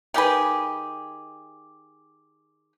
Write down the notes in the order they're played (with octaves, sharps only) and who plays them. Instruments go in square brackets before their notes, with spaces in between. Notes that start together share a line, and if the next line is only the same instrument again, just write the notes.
[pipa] D#3 G4 G#4 B4